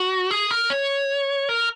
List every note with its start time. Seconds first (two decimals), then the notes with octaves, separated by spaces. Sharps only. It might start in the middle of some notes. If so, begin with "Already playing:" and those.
Already playing: F#4
0.31 G#4
0.51 A#4
0.70 C#5
1.49 A#4